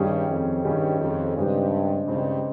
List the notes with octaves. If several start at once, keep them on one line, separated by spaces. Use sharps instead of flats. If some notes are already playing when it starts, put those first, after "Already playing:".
Already playing: G2 D#3 G3 C#4 G#4
F2
G2 D#3 G3 C#4 G#4
F2
G2 C#3 G#3 C4 D#4 G4
G2 C#3 G#3 C4 D#4 G4